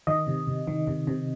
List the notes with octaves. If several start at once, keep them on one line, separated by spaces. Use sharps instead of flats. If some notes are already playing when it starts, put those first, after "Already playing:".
D#3 D#5
C3
C3
D#3
C3
C3